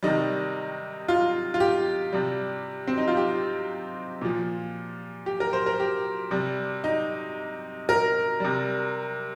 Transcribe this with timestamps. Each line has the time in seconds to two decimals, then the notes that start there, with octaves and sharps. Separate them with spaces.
0.03 C3 D#3 G3 D#4
1.08 F4
1.54 F4
1.60 G4
2.13 C3 G3
2.87 C4
2.98 D#4
3.08 F4
3.17 G4
4.21 A#2 F3
5.26 G4
5.40 A#4
5.53 C5
5.66 A#4
5.80 G4
6.31 C3 G3
6.84 D#4
7.89 A#4
8.40 C3 G3